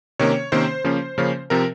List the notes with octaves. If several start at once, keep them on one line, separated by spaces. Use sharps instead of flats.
C3 D#3 A#3 C#4 C#5
C3 D#3 A#3 C#4 C5
C#3 F3 A#3 C#4
C#3 F3 A#3 C#4
C3 F3 C4 A#4